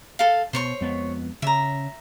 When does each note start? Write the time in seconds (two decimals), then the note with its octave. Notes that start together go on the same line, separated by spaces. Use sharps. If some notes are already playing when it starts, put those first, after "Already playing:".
0.19 A4 F5
0.53 B2 C5 C#5 C#6
0.81 F2 G#3 B3
1.42 C#3 E5 A#5